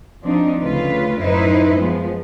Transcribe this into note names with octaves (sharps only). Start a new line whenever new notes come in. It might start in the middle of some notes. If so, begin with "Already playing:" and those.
F3 C4 D4 D#4
D2 C#3 F4 B4
F#2 A2 D#4 E4 B4 C5
F3 G#3 B3